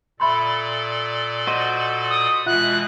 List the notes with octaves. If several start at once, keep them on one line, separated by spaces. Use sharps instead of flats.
A#2 A4 D5 E5 B5 C6
F#4 C5 D#5
D#6
B2 E3 G#3 F4 E5 F#5 F#6